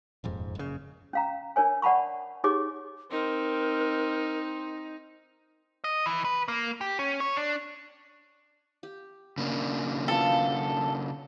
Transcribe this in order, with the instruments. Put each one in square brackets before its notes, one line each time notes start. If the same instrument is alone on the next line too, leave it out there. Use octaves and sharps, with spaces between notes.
[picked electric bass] D#1 F2 G#2
F#1 C#3
[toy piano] C#4 F5 A#5
D4 A#4 C#5 G#5
D5 F#5 A5 B5 C#6
D#4 G4 G#4 C#5 D6
[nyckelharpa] C4 [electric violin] D#4 [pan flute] A#4
[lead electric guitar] D#5
E3
B4
A#3
G4
C#4
C#5
D4
[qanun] G4
[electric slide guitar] C#3 A#3 D4
[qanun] B3 F4 F5 [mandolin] A4